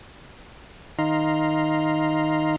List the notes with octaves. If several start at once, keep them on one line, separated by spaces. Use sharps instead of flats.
D#3 D#4 F5 A#5 C6